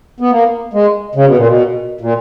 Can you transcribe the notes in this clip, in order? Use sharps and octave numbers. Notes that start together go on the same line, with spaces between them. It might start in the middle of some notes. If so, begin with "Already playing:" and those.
B3
A#3
G#3
C#3
B2
A#2
B2
A#2